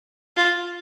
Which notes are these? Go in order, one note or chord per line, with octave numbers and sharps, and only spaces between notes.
F4